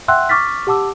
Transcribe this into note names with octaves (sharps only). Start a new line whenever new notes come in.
E5 F#5 G5 C6 E6 F#6
C#6 D6 F6 A6 B6
G4 F#5 A5 D6 E6